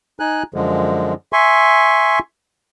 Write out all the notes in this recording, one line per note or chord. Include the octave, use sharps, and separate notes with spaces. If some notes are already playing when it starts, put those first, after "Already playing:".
D#4 G#5 F#6
F#2 D3 F3 G#3
E5 G#5 C6 C#6